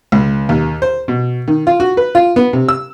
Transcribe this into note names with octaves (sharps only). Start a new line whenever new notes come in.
C#2
D#2
C5
B2
D#3
F4
F#4
B4
F4
B3
C3
E6